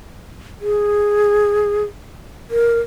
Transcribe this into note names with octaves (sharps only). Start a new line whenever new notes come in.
G#4
A#4